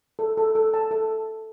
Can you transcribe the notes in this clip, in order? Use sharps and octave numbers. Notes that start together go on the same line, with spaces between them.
A4
A4
A4
A5
A4